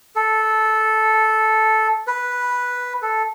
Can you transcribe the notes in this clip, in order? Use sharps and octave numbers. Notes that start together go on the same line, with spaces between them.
A4
B4
A4